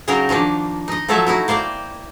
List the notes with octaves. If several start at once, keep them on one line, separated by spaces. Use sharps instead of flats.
C#3 F#3 D#4 A#4 D#5 G5
D#3 F3 A#3 D4
D#4 D#5
F3 F#3 A3 A4 C#5 E5
D#4 E4 F#4
A#3 C5 D5 G5